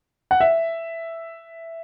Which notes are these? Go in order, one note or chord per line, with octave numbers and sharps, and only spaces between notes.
F#5
E5